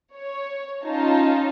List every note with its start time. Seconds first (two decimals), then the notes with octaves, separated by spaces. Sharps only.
0.15 C#5
0.85 C#4 D#4 F4 A5